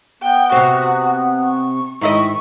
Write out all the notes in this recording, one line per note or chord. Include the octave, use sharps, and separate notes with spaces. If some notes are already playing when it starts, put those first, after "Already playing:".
B3 G5
C3 C4 F#4
C#6
G#2 D#3 E4 D#5 C#6